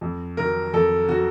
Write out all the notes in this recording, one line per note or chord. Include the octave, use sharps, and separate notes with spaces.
F2
D#3 F#3 A#4
F2 A4
D#3 F#3 F#4